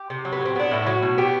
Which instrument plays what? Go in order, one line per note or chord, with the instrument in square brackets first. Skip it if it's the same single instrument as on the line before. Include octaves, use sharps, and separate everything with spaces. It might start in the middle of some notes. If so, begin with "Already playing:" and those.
Already playing: [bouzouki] G4
C3
F#3
B3
A2 C4
B3 D4
A2 E4
F#3 F#4
B2
B3 G4